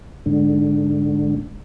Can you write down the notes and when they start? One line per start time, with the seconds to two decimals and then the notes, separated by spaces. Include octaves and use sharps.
0.26 G#2 D3